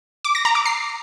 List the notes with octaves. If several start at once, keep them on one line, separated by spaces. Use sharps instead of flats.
D6
A#6
A#5
D6
C7